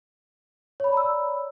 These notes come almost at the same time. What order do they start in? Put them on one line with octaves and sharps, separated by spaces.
C#5 B5 D5 A#5 E6